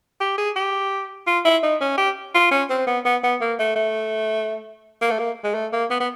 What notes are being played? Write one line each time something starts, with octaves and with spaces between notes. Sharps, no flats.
G4
G#4
G4
F4
E4
D#4
C#4
G4
F4
C#4
C4
B3
B3
B3
A#3
A3
A3
A#3
A3
A#3
G#3
A3
A#3
B3
B3